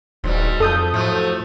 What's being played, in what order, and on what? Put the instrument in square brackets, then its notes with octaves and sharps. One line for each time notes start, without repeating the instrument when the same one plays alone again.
[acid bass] D#1 [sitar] G#2 F#3 G3
[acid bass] F2 [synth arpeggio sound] A4 D#6 G6
[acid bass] A2 [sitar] F3 F#3 A3